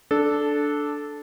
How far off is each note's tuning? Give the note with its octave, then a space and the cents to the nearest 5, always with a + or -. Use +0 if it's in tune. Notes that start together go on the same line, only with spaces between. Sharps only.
D4 +0 A4 -10